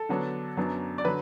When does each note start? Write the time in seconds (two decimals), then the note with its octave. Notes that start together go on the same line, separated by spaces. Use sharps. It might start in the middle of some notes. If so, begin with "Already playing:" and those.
Already playing: A4
0.09 D3 F#3 B3 D4
0.57 F#2 F#3 B3 D4
0.98 D5
1.05 D3 F#3 B4